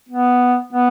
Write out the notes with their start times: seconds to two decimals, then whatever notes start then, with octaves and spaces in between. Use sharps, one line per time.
0.09 B3
0.73 B3